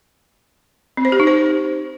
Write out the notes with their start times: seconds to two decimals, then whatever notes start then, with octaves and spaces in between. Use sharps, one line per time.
0.97 C4
1.05 C5
1.12 G4
1.20 D#4
1.27 C5